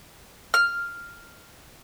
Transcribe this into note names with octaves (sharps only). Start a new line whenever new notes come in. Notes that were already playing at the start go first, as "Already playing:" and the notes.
F6